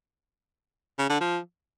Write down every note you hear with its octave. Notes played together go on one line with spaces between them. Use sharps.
C#3
D3
F3